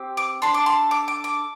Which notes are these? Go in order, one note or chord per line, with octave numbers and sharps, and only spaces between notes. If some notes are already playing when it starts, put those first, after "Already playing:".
Already playing: C4 G4
D6
D4 A4 C6
D6
C6
D6
D6
D6